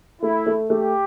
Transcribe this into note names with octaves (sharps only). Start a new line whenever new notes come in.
A3 E4
A3
A3 G4